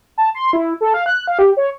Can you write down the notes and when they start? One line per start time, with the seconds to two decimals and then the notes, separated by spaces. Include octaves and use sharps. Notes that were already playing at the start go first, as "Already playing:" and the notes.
0.18 A5
0.35 C6
0.53 E4
0.81 A4
0.94 F5
1.06 F#6
1.27 F5
1.39 G4
1.57 C#5